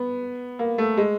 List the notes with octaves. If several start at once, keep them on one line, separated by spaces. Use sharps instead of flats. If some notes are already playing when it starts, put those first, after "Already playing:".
Already playing: B3
A#3
A3
G#3